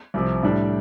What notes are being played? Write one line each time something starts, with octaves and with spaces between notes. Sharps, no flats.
C2 C3 F3
A2 G3 D4